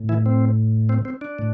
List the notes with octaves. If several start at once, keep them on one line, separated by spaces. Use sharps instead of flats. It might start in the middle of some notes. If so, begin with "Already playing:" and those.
Already playing: A2
E3 E4
C4
C4
C4
D4
A2